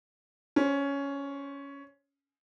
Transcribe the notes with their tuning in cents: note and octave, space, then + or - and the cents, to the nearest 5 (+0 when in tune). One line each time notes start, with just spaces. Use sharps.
C#4 +10 C5 +30